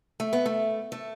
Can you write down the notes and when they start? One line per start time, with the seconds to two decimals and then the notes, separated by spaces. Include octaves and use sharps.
0.20 A3
0.33 B3
0.46 A3
0.92 A3